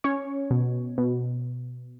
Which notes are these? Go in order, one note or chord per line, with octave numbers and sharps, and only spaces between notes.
C#4 C#5
B2
B2